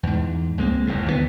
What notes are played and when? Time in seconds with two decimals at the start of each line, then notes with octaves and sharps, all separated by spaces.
0.03 E2 G#2
0.58 C#2 G#3 A#3 C4
0.87 F1 E2 G#2
1.06 D#2 D3 D#3 B3